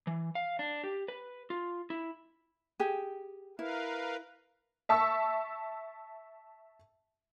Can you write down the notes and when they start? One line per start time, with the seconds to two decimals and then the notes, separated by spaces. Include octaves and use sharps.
0.07 E3
0.35 F5
0.59 D4
0.84 G4
1.08 B4
1.50 F4
1.90 E4
2.80 G4 G#4
3.59 E4 A#4 B4 F5
4.89 E5 A5 C#6 E6